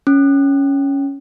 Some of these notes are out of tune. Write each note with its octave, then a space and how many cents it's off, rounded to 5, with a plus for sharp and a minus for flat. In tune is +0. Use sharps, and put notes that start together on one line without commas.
C#4 +5